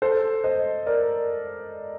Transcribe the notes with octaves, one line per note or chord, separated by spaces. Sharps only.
A4 C5
C5 D#5
A#4 D5